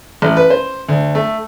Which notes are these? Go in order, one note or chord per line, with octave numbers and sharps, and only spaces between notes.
A1
B4
C5
D2
A3